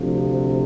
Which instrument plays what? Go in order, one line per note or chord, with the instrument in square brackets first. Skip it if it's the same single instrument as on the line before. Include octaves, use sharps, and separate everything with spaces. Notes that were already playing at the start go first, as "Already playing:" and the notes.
Already playing: [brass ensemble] D2 C3 F3